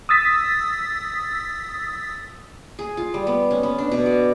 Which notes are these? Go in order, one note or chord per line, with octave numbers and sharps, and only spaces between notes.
D#6 E6 A6 B6
G#4
F4
G3
B3
C#4
B3
D4
B2
D5